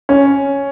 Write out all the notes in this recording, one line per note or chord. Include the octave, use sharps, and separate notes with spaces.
C#4